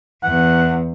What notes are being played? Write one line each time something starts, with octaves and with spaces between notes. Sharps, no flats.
E2 F#5